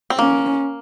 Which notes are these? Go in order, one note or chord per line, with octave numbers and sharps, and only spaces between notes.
C4
A#3 C#4